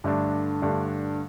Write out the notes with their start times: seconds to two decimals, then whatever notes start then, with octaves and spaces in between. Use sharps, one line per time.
0.04 G2 D3 A3 D4
0.62 G2 D3 A3 D4